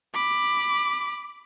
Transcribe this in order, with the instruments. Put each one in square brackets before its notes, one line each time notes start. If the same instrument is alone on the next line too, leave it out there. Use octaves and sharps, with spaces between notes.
[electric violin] B5 D6